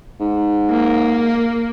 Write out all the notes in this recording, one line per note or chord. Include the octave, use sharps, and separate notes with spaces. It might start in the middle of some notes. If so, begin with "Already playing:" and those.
G#2
A#3